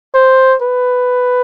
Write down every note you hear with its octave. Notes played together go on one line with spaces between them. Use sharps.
C5
B4